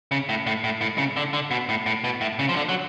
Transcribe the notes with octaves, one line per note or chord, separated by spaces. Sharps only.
C#3
A2
A2
A2
A2
C#3
D3
D3
B2
A2
A2
B2
A2
C#3
F3
D3
F#3